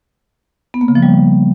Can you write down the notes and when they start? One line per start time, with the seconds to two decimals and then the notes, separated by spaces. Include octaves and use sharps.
0.74 B3
0.81 A#3
0.88 C#3
0.95 F3
1.03 G3